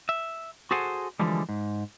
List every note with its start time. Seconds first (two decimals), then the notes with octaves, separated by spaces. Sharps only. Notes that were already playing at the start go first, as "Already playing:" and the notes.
0.09 E5
0.71 F#4 G#4 A4 C5 F#5 G#5
1.19 D3 E3 F3 G3 G#3
1.49 G#2